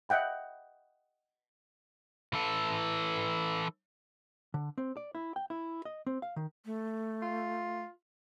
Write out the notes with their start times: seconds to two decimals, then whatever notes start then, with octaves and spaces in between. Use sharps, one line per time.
0.09 D#5 E5 F#5 G5 B5
2.34 E3 A4
4.54 D3
4.78 C4
4.97 D5
5.15 E4
5.36 G5
5.50 E4
5.85 D#5
6.07 C4
6.22 F5
6.36 D#3
6.66 A3
7.22 F4